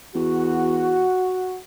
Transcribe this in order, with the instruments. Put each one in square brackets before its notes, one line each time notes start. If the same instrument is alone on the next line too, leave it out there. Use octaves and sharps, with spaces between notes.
[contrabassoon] E2 [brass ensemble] F#4